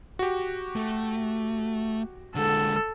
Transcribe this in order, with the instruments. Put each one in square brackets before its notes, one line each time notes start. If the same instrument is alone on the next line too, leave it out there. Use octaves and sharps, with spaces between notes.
[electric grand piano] F#4 G4
[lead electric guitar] A3
[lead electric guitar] D3 G#3 [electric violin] A4